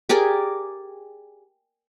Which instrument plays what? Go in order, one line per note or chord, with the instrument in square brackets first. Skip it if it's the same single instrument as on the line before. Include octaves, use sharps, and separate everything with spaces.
[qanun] G4 G#4 A#4 D5